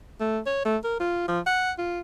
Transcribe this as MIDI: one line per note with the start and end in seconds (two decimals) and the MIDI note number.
0.21 0.40 57
0.47 0.63 73
0.65 0.77 57
0.84 0.99 70
1.00 1.27 65
1.28 1.40 53
1.47 1.72 78
1.78 2.00 65